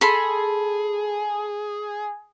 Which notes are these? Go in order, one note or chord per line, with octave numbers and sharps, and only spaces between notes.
G#4 A4 B5 C6